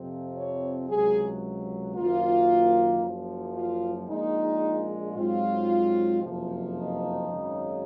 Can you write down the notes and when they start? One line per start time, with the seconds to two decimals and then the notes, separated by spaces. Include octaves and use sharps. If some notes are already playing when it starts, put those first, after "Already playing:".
Already playing: F2 C3 F3 C4
0.35 C#5
0.88 C#2 C3 F#3 G#4
1.95 F#1 F#2 D#3 A#3 F4
3.01 F#1 F#2 F3
3.54 F4
4.08 A#1 A#2 G#3 D#4
5.14 G#2 F#3 C4 F4
6.21 F#1 F2 C3 F3
6.75 D#4
7.28 G#1 F#2 C#3